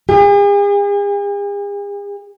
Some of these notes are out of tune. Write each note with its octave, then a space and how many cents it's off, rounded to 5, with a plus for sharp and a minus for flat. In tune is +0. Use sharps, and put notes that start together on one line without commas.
G#4 -45